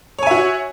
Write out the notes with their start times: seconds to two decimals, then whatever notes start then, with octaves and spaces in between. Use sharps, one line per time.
0.19 C#5
0.23 G#5
0.27 E5
0.31 F#4